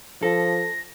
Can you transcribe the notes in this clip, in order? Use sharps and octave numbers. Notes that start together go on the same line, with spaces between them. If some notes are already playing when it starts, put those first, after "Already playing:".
F3 A4 A#6